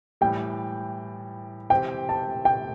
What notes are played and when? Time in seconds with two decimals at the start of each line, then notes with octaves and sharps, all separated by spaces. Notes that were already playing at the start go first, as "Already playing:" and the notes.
0.21 A2 E3 G3 G5
1.70 C3 E3 C4 G4 G5
2.09 A5
2.45 G5